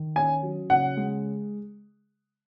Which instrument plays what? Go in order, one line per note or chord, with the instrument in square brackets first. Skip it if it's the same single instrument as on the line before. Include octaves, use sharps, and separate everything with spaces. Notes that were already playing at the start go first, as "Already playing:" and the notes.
Already playing: [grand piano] D#3
[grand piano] C#4 [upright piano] G#5
[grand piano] F#3
[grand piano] C#3 [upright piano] F#5
[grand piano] G#3